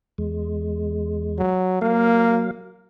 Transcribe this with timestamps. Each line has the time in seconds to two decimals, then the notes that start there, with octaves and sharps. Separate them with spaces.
0.18 E2 G#3
1.38 F#3
1.82 F#3 A#3 F5